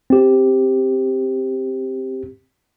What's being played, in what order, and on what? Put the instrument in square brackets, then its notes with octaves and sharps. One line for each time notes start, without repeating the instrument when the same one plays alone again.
[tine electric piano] C4 G4